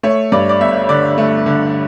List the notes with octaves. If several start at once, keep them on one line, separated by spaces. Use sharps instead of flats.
A3 C#5
G2 D5
D5
G1 E5
D3 D5
A3
D3